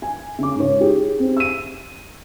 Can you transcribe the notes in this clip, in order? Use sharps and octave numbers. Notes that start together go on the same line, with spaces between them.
G#5
C#3 D6
G#2 C#5
G4 G#4
C4
E6 D#7